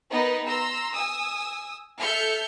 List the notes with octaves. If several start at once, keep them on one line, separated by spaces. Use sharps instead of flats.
B3 D#4 A#4 B4 D#5
A#5 C6 E6
G#5 D#6 E6
A4 E5 F6 G6 C#7